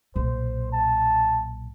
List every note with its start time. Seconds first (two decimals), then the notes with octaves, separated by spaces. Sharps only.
0.16 B1 A#2 C5
0.72 A5